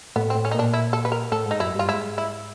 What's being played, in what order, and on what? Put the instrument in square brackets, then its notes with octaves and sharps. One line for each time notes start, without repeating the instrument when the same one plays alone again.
[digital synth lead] A2 [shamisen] B3
[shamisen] C4
[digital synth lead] A2
[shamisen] C#4
D#4
[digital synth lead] A#2 [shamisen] D4
[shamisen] E4
A4
B4
A#4
[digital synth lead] A2 [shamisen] A4
[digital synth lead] G#2
[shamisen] D#4
[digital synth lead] F#2 [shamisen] E4
[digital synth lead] G2 [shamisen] F4
[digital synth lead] G#2 [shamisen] E4
[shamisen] E4